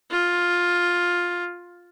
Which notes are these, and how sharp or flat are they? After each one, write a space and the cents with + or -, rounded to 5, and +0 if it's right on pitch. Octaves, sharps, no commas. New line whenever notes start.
F4 +10